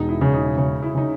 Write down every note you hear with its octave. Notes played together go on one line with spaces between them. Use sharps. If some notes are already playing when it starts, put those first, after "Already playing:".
Already playing: E1 D#4
E4
C#3
D#4
C#3 C#4
E4
C#3 D#4